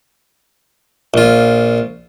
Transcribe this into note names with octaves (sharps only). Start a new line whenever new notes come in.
A#1 F4